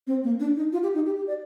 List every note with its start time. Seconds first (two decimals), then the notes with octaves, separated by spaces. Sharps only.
0.07 C4
0.24 A#3
0.40 D4
0.56 D#4
0.73 F4
0.83 G4
0.94 D#4
1.06 G4
1.17 G4
1.27 D5